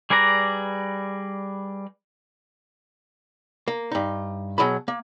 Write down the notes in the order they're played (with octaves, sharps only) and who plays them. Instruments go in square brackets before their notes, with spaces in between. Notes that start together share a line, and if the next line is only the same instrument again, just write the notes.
[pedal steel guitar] G3 G#4 B4 D5 A#5
[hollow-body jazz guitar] A#3
G2 D#4
B2 F#3 G#4 A5 B5
A#3